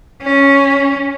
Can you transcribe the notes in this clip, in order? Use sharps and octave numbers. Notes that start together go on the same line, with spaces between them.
C#4